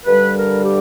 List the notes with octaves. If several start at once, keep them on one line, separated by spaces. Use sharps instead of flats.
G2 D3 G3 B4
A#4
G4